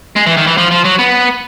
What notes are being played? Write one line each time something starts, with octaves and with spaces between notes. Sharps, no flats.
G#3
E3
D#3
E3
F3
F3
F#3
B3